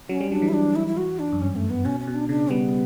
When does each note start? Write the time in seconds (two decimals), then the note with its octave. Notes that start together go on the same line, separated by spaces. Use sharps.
0.09 F#3 C#4
0.21 G3
0.31 F#3 D4
0.42 E3
0.49 E4
0.53 D4
0.76 E4
0.87 E4
0.97 F#4
1.19 D4
1.32 F#2
1.41 G2 C#4
1.56 A3
1.70 B3
1.85 B2 C#4
2.00 C#4
2.07 B2
2.14 D4
2.29 C#3 D4
2.50 G3 B3